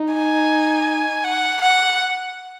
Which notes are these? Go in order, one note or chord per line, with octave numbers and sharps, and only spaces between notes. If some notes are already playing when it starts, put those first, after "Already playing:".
Already playing: D#4
G#5
F#5
F#5